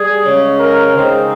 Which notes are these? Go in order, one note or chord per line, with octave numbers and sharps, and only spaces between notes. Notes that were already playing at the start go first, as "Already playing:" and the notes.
Already playing: G3 G#4
C#3 G#3 C#4
A#4
C#3 G#3 C4 D#4